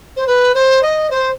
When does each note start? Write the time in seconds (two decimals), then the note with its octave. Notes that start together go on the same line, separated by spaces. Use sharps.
0.17 C5
0.27 B4
0.55 C5
0.83 D#5
1.11 C5